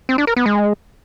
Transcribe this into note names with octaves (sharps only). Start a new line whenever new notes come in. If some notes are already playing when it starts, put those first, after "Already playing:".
C4
D4
A#4
B3
G#3